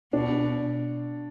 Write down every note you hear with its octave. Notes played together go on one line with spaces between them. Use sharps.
B2 D4